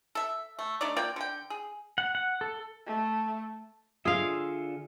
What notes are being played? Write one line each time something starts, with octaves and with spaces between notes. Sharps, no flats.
A4 E5
A3
A3 D4 D#4 D5
A#3 F4 D5 G5
D3 G5
G#4
F#5
F#5
A4
A3
D3 F4 G#4 E5 F5